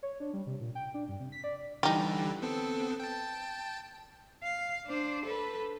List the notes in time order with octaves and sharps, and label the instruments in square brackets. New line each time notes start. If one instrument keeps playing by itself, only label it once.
[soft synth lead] C#5
D4
G3
C3
A#2
G5
D4
G2
C3
B6
D5
[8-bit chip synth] D3 E3 G3 [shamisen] D#4 G4
[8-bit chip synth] B3 C4 A4
G5 A5
[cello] F5
D4 C5
A4 B4